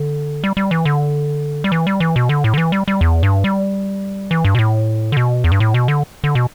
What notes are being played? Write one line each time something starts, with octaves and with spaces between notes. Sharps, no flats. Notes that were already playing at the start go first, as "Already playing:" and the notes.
Already playing: D3
G3
G3
E3
D3
G3
E3
G3
E3
B2
D3
A2
D3
E3
G3
G3
E2
G2
G3
E3
G2
B2
A2
D3
B2
E2
G2
A2
B2
D3
D3
B2